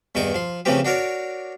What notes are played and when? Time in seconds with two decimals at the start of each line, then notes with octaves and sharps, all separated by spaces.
0.15 E2 G2 D#3 D#4 C#6 D6
0.35 F3 C6
0.65 C#3 E3 F3 A3 C4 G4
0.85 D4 F#4 A#4 C#5 D5